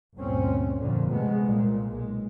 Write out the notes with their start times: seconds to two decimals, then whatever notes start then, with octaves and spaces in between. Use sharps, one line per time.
0.16 G1 D2 A#2 C4 C#4
0.80 F2 A#2 D3 F3
1.10 C3 G#3 A3 B3
1.44 C2 A#2 G#3
1.87 B1 G#3